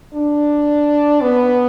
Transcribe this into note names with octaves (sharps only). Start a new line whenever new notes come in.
D4
B3